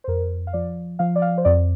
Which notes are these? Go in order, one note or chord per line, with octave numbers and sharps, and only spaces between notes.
C5
F2 A#4
F5
F3 D5
F3 F5
D5
F5
C5
F2 D5